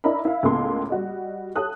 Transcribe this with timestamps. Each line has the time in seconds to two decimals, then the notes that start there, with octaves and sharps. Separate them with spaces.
0.04 D4 E4 A#4 D#5 A#5 B5
0.25 E4 F5
0.43 C#2 A2 A#3 B3 A4 C6
0.90 G3 F#4 D#5
1.56 G4 A4 C#5 D#6 F#6